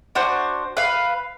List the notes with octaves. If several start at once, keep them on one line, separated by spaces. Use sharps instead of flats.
D4 F#4 C5
B4 F5